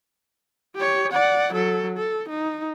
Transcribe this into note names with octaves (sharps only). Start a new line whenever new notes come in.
G4 C#5
D5 F#5
F#3 A4
A4
D#4